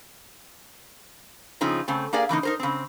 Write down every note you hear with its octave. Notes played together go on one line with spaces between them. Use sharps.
C#3 F3 C4 D#4 F4
C#3 A3 C4
A#3 G4 G#4 A#4 D5 F5
C#3 E3 A#3 D#4
D#4 A#4 C5
C#3 C4